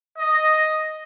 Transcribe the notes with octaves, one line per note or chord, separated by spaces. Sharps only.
D#5